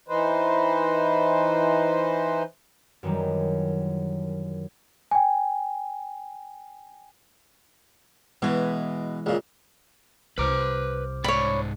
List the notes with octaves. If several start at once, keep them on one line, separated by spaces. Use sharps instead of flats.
E3 D#4 B4 C5
F#2 D#3 E3 F#3 G3
G5 G#5
B2 E3 G#3
C#2 A#2
C2 B4 C5 A#5 D6 F6
G#2 C#5 D5 B5